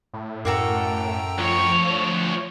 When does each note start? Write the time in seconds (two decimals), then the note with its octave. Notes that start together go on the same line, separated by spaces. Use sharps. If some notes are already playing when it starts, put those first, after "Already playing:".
0.13 A2
0.45 F#2 A#3 F#4 A4 G5 A#5
1.38 D2 F3 C#5